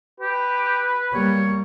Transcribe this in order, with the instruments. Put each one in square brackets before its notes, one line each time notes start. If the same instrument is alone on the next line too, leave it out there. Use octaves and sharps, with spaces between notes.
[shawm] G4 [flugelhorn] B4
[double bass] G3 A#3 [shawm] C#5